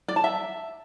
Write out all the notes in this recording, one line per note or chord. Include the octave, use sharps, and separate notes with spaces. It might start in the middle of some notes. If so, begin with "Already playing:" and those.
D5
A5
E5